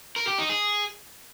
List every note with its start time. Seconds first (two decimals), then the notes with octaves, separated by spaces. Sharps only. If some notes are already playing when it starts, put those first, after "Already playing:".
0.16 A#4
0.27 G4
0.38 D#4
0.50 G#4